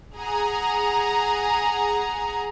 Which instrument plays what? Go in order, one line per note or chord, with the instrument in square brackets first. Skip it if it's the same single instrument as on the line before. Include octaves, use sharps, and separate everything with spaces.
[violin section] G#4 F#5 G#5 A#5